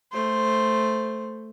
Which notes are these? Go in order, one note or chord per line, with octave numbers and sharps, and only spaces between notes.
A3 C5